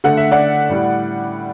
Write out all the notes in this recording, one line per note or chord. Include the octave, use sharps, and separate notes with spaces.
D3 A3 F#5
E5
D5 F#5
A2 G3